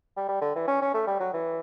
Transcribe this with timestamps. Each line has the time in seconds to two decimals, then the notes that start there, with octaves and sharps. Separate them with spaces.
0.16 G3
0.28 G3
0.41 D3
0.56 E3
0.68 C#4
0.82 C#4
0.94 A3
1.07 G3
1.20 F#3
1.34 E3